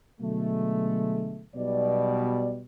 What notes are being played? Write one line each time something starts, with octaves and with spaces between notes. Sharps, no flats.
B2 D3 F#3 G#3 A3
B1 B2 G3 D5